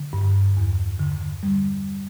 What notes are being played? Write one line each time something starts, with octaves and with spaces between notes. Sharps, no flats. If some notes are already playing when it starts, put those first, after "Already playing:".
Already playing: D3
G2
E2
D3
G3